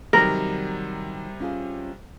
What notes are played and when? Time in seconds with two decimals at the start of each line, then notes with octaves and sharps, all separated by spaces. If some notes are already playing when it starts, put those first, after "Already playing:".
0.13 C3 D#3 F#3 G3 F#4 A#4
1.40 C#4 F4 G#4